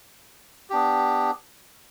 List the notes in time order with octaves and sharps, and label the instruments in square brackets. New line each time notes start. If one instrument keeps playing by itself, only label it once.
[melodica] B3 D4 G4